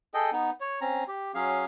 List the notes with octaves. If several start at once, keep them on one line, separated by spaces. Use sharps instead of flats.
G#4 A4 D#5 G5
B3 D#4
C#5
C4 C#4 A#5
G4
F#3 C#4 G#4 F5